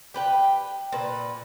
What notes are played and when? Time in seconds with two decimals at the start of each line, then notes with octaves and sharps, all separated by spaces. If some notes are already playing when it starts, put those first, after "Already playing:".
0.14 G4 B4 G5
0.92 A#2 B4